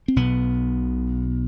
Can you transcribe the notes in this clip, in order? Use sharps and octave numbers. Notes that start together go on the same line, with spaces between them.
C4
B1 B2 B3